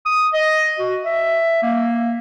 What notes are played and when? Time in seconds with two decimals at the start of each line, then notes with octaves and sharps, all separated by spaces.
0.06 D#6
0.33 D#5
0.79 F#4
1.05 E5
1.62 A#3